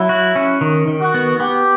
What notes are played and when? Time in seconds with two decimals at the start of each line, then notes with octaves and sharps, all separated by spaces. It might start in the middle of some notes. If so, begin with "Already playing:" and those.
Already playing: F#3 E4
0.09 F#4
0.36 C#4
0.61 D#3
0.87 D#3
1.01 F#4
1.14 B3
1.40 B3 G4